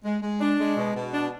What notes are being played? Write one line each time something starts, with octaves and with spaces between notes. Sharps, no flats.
G#3
G#3
D4
G#3
B2
B2
D4